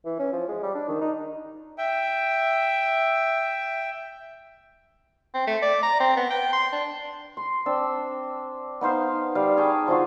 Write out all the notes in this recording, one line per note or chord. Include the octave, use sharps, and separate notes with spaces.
E3
C#4
F3
G#3
G3
D4
D#3
D#4
E5 G5
C4
A3
D5
A#5
C4
B3
G5
C6
D4
C6
C4 D4 A5 E6
B3 D#4 C5 F5
G3 F5
G#4 C#5 G5 A5
F3 D4 F4 F#4